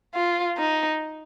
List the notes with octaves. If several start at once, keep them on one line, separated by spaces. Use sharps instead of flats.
F4
D#4